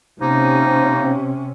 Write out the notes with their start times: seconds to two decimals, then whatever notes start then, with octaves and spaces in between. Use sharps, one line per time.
0.21 C3 F3 A#3 C#4 D#4